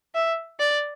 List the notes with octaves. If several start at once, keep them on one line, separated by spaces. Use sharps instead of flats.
E5
D5